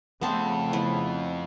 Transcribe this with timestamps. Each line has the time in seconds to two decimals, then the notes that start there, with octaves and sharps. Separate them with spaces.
0.21 F2 C#3 A3 B3 C4 C5 A5
0.73 B3 E4 B4